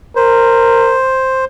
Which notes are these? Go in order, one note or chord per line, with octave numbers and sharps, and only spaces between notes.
A#4 C5